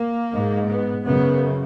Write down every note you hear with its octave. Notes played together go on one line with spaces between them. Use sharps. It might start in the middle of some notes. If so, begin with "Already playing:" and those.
Already playing: A#3
G#2
B3
F#2 C#3 B3